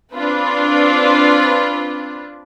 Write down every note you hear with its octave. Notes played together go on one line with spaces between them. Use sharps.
C4 D4 F4 B4